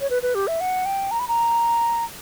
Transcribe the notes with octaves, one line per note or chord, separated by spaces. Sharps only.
C#5
B4
B4
G4
E5
F#5
G5
A#5
B5
A#5